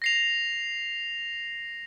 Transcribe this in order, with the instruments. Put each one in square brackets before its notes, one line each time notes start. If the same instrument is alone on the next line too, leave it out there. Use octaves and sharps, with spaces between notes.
[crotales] A#6 C7 F7